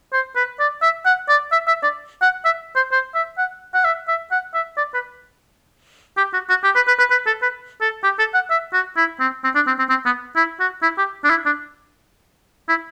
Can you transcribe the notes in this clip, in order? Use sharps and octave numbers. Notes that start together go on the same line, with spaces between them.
C5
B4
D5
E5
F#5
D5
E5
E5
D5
F#5
E5
C5
C5
E5
F#5
F#5
E5
E5
F#5
E5
D5
B4
G4
F#4
F#4
G4
B4
B4
B4
B4
A4
B4
A4
G4
A4
F#5
E5
F#4
E4
C4
C4
D4
C4
C4
C4
B3
E4
F#4
E4
G4
D4
E4
D4
E4